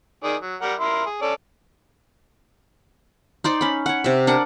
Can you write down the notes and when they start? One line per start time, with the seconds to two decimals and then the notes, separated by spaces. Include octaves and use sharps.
0.24 D#3 G#4 D5
0.41 F#3
0.62 G3 A#4 F#5
0.80 E4 A#4 C6
1.05 G#4
1.22 C#4 A4 D5
3.44 D#4 C5 D5
3.61 C#4 B5
3.86 C#5 F#5
4.04 C3 E5
4.27 D4 A#4 F#5